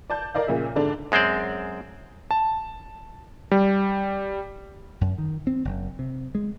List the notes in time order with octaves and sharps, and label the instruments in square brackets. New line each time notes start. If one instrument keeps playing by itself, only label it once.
[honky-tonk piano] D5 A5 G6
A#4 D5 D#5 F5
A#2 C#3 E5
G#2 D3 D4
[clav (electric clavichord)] F#2 G#3 C4 C5 D5
[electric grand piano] A5
G3
[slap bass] F#2
D#3
C4
F#1
C3
G#3